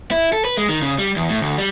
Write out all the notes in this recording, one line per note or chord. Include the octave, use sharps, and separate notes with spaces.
E4
A4
B4
G#3
D#3
C#3
G3
E2
A2
D2
G3